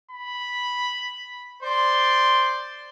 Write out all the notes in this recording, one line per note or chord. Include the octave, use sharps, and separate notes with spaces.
B5
C5 D5 C6